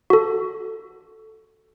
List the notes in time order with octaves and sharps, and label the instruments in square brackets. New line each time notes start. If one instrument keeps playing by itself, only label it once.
[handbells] F#4 A4